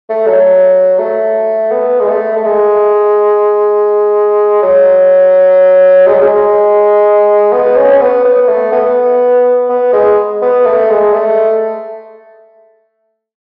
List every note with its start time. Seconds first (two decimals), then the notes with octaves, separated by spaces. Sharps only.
0.09 A3
0.27 F#3
0.99 A3
1.71 B3
2.00 G#3
2.08 A3
2.37 A3
2.45 G#3
4.62 F#3
6.07 G#3
6.15 F#3
6.22 G#3
7.52 B3
7.76 C#4
7.91 C#4
8.01 B3
8.25 B3
8.48 A3
8.72 B3
9.70 B3
9.93 G#3
10.42 B3
10.66 A3
10.90 G#3
11.14 A3